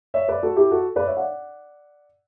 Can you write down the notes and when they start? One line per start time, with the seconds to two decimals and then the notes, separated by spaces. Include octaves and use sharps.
0.14 C#5 E5
0.28 B4 D5
0.43 F#4 A4
0.56 E4 G4
0.71 F#4 A4
0.96 B4 D5
1.07 C#5 E5
1.17 D5 F#5